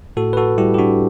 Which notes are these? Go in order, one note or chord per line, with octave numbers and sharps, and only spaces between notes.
A2 F#4 A4
B4
F#4 A4
G3 E4 G4
G4
D4 F#4